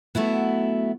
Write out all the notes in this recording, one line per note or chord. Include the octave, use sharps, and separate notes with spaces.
F#3 A3 B3 E4 F#4